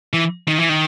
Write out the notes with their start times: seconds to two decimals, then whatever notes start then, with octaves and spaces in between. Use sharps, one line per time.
0.13 E3
0.48 D#3
0.58 E3
0.69 D#3